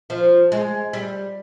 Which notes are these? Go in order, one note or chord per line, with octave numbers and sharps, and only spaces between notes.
F3
G#3
G3